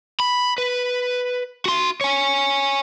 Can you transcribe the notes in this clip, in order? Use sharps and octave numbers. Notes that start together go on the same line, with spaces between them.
B5
B4
F#4 C6
C#5 G#5